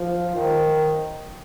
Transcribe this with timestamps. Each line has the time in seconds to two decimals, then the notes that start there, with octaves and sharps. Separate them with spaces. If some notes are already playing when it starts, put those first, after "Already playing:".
Already playing: F3
0.35 D#3